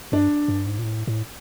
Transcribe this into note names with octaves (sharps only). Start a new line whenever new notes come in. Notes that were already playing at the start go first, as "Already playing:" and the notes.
G2 D4
G2
G#2
A#2
A2
A2